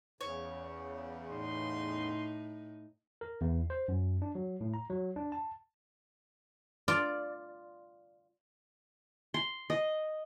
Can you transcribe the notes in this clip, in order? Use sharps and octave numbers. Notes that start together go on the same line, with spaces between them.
E2 C#3 C#5
A2 D#4 C6
A#4
E2
C5
F#2
D4
F#3
A2
A#5
F#3
D4
A5
F4 D5
C6
D#5